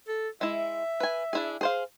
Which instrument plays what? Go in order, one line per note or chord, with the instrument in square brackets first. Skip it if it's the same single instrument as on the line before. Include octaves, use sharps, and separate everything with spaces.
[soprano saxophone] A4
[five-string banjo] G#3 E4 [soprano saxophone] E5
[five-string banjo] B4 G#5
D4 E4 G#4
G#4 C5 F5